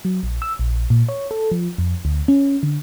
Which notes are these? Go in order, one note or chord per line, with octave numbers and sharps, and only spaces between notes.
F#3
A#1
E6
A#1
A#2
C#5
A4
F3
F2
D2
C#4
D3